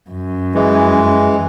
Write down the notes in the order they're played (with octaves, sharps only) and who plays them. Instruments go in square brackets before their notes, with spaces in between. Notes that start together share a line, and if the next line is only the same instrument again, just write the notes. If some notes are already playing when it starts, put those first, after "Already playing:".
[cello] F#2
[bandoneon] E3 G#3